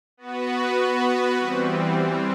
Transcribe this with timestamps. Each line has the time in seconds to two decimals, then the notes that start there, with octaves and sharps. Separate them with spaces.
0.17 B3 F#4 B4
1.37 E3 G3 C4